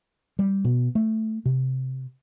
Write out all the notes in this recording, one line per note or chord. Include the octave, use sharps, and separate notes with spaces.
G3
B2
A3
C3